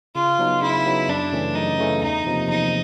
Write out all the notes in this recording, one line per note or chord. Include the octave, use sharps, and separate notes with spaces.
C#3 F4
F#3 B3 D#4
C#3 E4
F#3 B3 D#4
F#2 D4
C#3 E3 A3 C#4
F#2 D#4
C#3 E3 A3 C#4
E2 D#4
C3 F3 A#3
E2 D#4